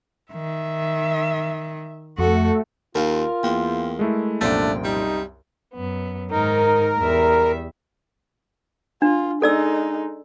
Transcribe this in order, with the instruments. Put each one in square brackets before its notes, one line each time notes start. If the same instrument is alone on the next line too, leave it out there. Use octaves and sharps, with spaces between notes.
[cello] D#3 [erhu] E5
[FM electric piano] F2 [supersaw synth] A3 [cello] F#4 A4
[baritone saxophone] D#2 [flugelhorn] F4 [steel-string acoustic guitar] A#4 F5
[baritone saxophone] E2 [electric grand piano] A#3 G5
[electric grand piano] G#3 A3 E4
[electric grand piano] C2 F#2 [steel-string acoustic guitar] A#2 F3 G5 [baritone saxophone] A3 [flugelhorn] D4
[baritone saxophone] G3 [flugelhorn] D#4
[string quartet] F#2 B3
[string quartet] G#2 D#3 D#4 [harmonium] A#4
[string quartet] E2 G3 E5
[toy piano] D4 [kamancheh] F4
[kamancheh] G#3 D#4 [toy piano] A4 D5 E6